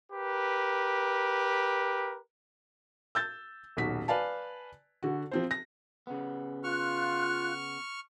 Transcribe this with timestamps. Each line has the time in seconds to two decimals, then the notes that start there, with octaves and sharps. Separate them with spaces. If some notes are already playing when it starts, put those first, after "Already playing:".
0.12 G4 A#4 B4
3.15 E6 G6 A6
3.77 D#1 B1 F#4 B6
4.08 B4 D5 F5 G#5 A5
5.03 D3 F#4
5.31 F3 C4 C5
5.51 A#6
6.07 C#3 B3
6.64 F4 C#6 F6 F#6